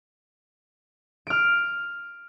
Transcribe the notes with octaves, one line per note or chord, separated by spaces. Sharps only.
F6 D7